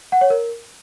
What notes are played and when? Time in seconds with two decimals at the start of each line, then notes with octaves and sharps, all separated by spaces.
0.12 F#5
0.21 C#5
0.30 A#4